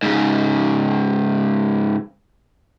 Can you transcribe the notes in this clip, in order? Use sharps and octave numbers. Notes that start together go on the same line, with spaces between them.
G#2 C#3